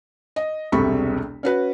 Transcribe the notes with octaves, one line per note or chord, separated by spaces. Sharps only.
D#5
E1 C2 C3 A4 B5 C#6
C#4 F#4 B4